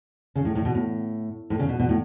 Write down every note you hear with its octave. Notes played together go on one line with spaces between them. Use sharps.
C#3
A2
A2
B2
A2
A2
C#3
B2
B2
A2